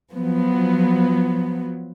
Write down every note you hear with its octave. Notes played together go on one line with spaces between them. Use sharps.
F3 F#3 B3